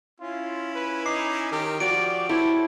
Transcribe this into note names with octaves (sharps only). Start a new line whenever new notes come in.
C#4 E4 F4
B4
D#4 D6 C7
D#3 G4 A#4
F3 F#4 G4 D5 D7
E4 G4 A4 C5 C#5